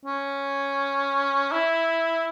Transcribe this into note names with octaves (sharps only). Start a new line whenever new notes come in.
C#4
E4